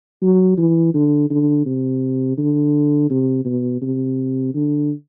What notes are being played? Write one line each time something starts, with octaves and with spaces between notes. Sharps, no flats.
F#3
E3
D3
D3
C3
D3
C3
B2
C3
D3